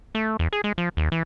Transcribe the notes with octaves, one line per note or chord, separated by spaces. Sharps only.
A3
E2
G#4
G#3
F3
D#2
E3